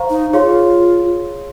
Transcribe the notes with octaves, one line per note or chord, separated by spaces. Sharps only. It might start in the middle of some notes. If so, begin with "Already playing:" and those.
Already playing: C5 F5 A#5 C#6
D#4
F4 G#4 C#5 F5 C6